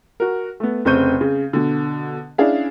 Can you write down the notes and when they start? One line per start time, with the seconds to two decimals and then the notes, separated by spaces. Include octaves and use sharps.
0.20 F#4 A#4
0.60 A3 B3
0.85 F1 C#3 C4 C#6 G6 D#7
1.21 C#3
1.53 B2 D3
2.38 C#4 D4 E4 G#4 D5 F5